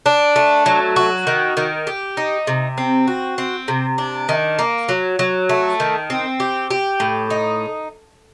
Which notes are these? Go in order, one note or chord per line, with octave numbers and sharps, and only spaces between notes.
D4
A3
F#3
F#4
D#3
D#3
G4
D#4
C3
C4
F#4
C4
C3
D4
D#3
A#3
F#3
F#3
A3
D#3
C4
G4
G4
A2
D#4